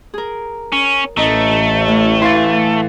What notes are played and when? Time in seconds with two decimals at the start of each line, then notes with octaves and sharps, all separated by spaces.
0.14 G#4 A#4
0.72 C#4
1.17 A1 A3 D#5 A#5
1.88 A2
2.22 E3 F5 C6 A6